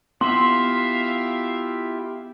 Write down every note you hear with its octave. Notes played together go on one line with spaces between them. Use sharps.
B3 E4 F4 G4 E5 F5 C6